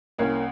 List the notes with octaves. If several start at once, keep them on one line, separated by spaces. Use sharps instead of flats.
C2 A#3 C#4